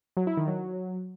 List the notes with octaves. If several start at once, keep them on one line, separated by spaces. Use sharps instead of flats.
F#3
E4
D#3
F#3